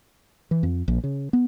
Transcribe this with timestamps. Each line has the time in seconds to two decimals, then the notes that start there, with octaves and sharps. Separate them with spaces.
0.51 E3
0.63 F2
0.88 A#1
1.04 C#3
1.33 B3